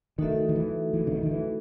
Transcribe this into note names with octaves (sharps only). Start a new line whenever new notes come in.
D#3 A3 D#4 F#4 A4 E5
D#3
E3
E3
C#3
D#3
D#3
E3